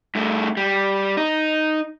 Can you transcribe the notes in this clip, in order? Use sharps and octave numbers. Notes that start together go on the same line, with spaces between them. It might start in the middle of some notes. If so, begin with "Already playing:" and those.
G2 A3
G3
D#4